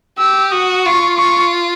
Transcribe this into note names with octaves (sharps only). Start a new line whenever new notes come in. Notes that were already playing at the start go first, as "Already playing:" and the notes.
G4 E6
F#4 D#6
F4 C#6
C#6